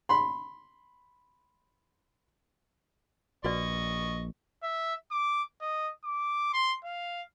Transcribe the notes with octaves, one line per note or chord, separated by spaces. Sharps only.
B5 C6
A#1 F#4 B4 D5 D#5 C#6
E5
D6
D#5
D6
C6
F5